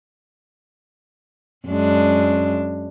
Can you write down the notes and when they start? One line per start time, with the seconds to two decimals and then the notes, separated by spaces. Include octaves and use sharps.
1.68 F#2 G#3 D4